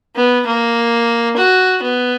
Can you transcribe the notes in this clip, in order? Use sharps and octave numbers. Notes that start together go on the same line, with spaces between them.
B3
A#3
F#4
B3